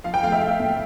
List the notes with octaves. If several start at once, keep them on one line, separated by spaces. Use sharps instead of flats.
F3 F5
G5
A3 F5
E5
A3
A2